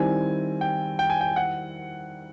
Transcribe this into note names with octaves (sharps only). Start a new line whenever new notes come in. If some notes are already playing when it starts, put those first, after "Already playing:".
Already playing: D#3 G3 C4 E4 G#5
G5
G5
G#5
G5
F#5